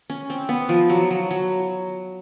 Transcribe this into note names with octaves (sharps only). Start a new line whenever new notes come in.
C#4
C4
B3
F3
F#3
F#3
F#3